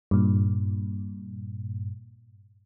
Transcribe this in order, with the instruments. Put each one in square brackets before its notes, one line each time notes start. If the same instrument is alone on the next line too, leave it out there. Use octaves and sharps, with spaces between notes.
[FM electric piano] G2 A#2